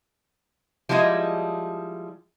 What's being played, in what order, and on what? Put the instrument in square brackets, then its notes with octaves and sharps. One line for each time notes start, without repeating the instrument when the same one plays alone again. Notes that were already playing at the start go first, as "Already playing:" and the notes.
[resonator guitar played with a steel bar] F3 G3 G#3 E4 D#5